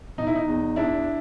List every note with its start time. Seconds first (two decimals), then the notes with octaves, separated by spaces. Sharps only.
0.18 B2 D#4
0.27 E4
0.35 D#4
0.48 E2
0.76 E2 D4 E4